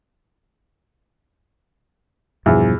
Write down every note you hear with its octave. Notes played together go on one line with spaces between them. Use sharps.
E2 G2 B2 F3